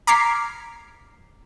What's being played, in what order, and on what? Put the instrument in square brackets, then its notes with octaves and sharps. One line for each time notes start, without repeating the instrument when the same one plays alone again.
[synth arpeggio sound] A#5 D6 F6 G#6 B6 C7